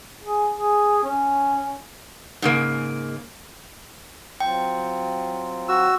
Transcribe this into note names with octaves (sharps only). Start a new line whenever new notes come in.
G#4
G#4
C#4
G#2 C#3 A#3
F#3 C4 F4 G5
F#4 E6